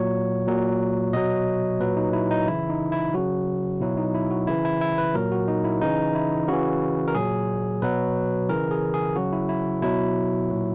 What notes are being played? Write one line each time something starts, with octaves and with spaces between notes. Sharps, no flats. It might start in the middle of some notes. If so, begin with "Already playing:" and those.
Already playing: A#2 F#3 C#5
A#2 F#3
B2 F#3 D#5
A#2 F#3 B4
D#4
E4
D#4
C#3 E3 E4
D#4
E4
C#3 F#3 F#4
B2 F#3 E4
D#4
E4
F#4
C#3 E3 E4
E4
E4
B4
A#2 F#3 A#4
F#4
D#4
E4
C#3 E3 D#4
E4
C#3 E3 F#4
A#4
A#2 F#3 G#4
B2 F#3 B4
C#3 E3 A#4
G#4
G#4
C#3 F#3 F#4
E4
E4
B2 F#3 E4
A#2 F#3